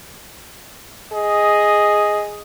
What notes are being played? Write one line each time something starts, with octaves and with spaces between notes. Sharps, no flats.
G#4 D#5